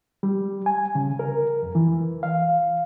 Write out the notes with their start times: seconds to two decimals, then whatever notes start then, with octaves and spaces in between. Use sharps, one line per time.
0.23 G3
0.66 G#5
0.95 C#3
1.19 A#4
1.63 F2
1.75 E3
2.23 F5